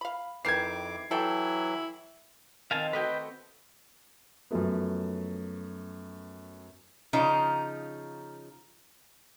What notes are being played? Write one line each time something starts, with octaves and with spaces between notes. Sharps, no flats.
F5 B5
F2 D#3 E3 D6 G#6 C7
E3 F#3 E4 A4 G5
D#3 F3 C4 F5 G#5 A5
A3 E4 F#4 B4 D#5 G5
F#2 F3 F#3 A3 B3
C#3 F3 D#4